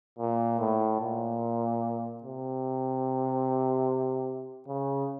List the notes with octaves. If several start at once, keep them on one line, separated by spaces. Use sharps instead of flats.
A#2
A2
A#2
C3
C#3